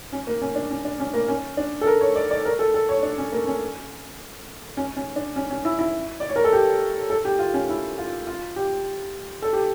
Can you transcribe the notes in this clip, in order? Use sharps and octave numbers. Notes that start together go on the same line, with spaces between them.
C#4
A#3
C#4
D4
C#4
D4
C#4
A#3
C#4
D4
A4
A#4
C#5
D5
D5
A#4
A4
A4
C#5
D4
C#4
A#3
C#4
C#4
C#4
D4
C#4
C#4
E4
E4
D5
C#5
A#4
A4
G4
A4
G4
F4
C#4
E4
F4
F4
G4
A4
G4